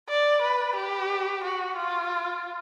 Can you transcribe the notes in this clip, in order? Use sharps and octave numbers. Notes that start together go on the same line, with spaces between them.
D5
B4
G4
F#4
F4